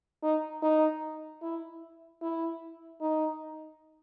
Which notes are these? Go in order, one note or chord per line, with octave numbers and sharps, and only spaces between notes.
D#4
D#4
E4
E4
D#4